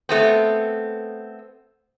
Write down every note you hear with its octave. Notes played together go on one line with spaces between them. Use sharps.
A3 B3 C4